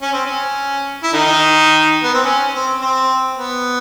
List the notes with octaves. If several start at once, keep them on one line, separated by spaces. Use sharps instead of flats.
C#4
C4
C#4
E4
D#3 D#4
B3
C4
C#4
C4
C4
B3